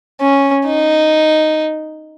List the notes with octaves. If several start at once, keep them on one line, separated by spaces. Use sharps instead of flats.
C#4
D#4